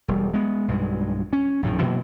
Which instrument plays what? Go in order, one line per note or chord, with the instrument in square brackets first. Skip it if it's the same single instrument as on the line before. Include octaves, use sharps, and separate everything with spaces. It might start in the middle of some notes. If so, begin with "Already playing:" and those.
[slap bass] E1 G3
G#3 B3
B1 G2 B2 G#3
C#4
A#1 F#2 A2 D#3
B2 E3 F#3 A#3